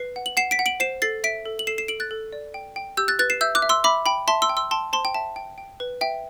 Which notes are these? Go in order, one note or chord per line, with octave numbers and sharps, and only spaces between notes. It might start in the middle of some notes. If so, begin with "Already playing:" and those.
Already playing: B4 C7
F#5
F#7
F#5 C7 E7
B6 D7
F#5
D7 F#7
C5 C7 E7
A4 A6 C7
E5 B6 D7
A4
F#7
A4 C7 E7
C7 E7
A4 D7 F#7
F#6 A6
A4
D5
G5
G5
G4 E6 G6
F#6 A6
B4 F#6 A6
C7 E7
E5 E6 G6
D6 F#6
E5
C6 E6
E5 B5 D6
G5 B5
E5 A5 C6
C6 E6
G5
C6 E6
G5 A5 C6
C5 A5 C6
G5
E5 A5
G5
G5
B4
E5 G5